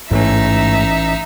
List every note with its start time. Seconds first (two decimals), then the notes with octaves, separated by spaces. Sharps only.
0.11 A1 G#2 E3 A3 C#4 D#4 E5